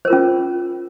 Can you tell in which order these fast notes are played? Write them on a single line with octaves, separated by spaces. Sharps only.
C5 A#4 F4 C#4